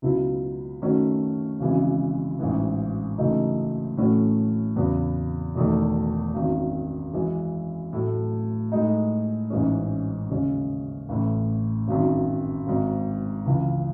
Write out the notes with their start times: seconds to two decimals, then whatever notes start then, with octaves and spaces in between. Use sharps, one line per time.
0.02 C#2 B2 F#3 B3 E4
0.81 F#2 D#3 A3 C#4 F#4
1.59 G#1 F#2 C#3 E3 G#3
2.39 A1 G#2 E3
3.18 F#1 F#2 E3 A3 D#4
3.97 A2 E3 A3 C#4 F#4
4.76 E2 C#3 F#3 B3
5.55 E1 E2 D#3 A3
6.34 G#1 F#2 D#3
7.13 F#2 E3 G#3 C#4
7.93 A2 F#3 A3
8.72 A2 G#3 D#4
9.50 A1 G#2 E3 G#3 C#4
10.30 D#2 C#3 G#3 C#4
11.09 A1 A2 E3
11.88 G#1 F#2 D#3
12.67 G#1 G#2 D#3
13.46 C#2 C#3 E3